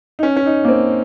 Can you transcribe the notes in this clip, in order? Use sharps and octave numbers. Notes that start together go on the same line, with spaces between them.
D#4
C#4
C#4
D#4
A#3
C4